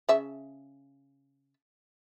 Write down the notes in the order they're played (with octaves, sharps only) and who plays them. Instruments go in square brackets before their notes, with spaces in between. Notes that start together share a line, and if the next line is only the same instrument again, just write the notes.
[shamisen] C#3 E5 A5